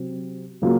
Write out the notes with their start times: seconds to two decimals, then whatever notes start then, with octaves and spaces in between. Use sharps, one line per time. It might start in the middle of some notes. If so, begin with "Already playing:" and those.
Already playing: C3 F#3 C4
0.62 C#3 F#3 A#3 F4